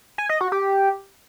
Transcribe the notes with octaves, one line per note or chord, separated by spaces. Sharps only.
G#5
D#5
F#4
G4